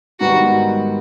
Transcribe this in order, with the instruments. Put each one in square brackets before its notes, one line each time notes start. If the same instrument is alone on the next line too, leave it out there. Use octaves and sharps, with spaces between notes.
[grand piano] G#2 D#3 G3 B3 [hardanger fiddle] F#4